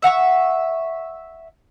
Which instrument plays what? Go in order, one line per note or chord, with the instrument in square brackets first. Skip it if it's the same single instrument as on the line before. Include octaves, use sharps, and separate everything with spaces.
[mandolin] E5 F#5 A#5 C#6